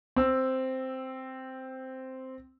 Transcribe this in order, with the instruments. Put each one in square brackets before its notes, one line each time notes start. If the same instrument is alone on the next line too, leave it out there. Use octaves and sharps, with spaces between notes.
[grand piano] C4 E6